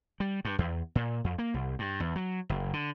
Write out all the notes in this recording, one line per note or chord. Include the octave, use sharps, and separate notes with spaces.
G3
G2
E2
A#2
F2
A#3
C2
G2
E2
F#3
F#1
D3